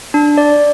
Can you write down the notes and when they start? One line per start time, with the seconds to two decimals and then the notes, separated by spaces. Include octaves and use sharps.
0.14 D4
0.38 D5